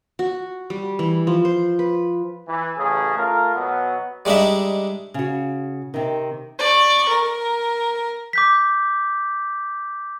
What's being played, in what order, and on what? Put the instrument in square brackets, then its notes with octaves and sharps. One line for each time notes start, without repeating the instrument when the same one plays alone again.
[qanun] F#4
G3
E3
F3
C5
B4
[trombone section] E3
A1 C#3 G#4
A3 F4 A#4
B2 F#3 B3
[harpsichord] G3 G#3 D4 D#4 E5
[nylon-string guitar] C#3 F#4
C3 D#3
[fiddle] D5 C#6
A#4
[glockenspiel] D6 G6 B6